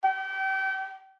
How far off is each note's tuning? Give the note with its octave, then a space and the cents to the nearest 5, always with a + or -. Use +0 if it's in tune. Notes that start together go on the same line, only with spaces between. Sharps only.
G5 -35